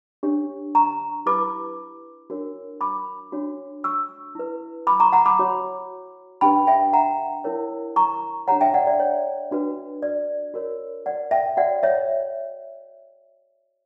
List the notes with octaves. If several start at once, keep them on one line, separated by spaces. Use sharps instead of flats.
D4 G4 C#5
A#5 C#6
E4 G4 B4 B5 D6
D4 F#4 A#4 C#5
B5 D6
D4 F#4 C#5
C#6 E6
E4 B4
B5 D6
A#5 C#6
F#5 A#5
B5 D6
F#4 C#5
D4 G4 B4 G5 B5
E5 G5
F#5 A#5
E4 A#4 C#5
A#5 C#6
D4 G4 C#5 F#5 A#5
E5 G5
D5 F#5
D5
C#5
D4 F#4 B4
D5
F#4 A#4 C#5
D5 F#5
E5 G5
F#4 C#5 D5 F#5
C#5 E5